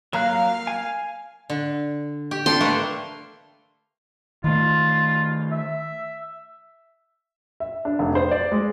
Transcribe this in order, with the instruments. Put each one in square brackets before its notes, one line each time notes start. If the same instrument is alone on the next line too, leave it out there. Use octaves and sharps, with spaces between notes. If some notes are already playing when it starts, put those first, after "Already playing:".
[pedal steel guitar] F#3 A#5 F#6 [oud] A#3 [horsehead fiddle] F5
[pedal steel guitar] G#5
[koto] D3
G4
[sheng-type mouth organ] D4 A4 G5 [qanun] C6
[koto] A3 A#3 B4
[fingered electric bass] D#3 A3 [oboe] F4
[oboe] E5
[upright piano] E5
D4
F1
C5
D5
G#3